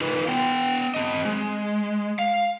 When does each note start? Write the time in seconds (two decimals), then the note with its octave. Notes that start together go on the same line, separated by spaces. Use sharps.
0.01 D#4 F4 B4
0.28 B3 G5
0.94 C4 D#5
1.25 G#3
2.19 F5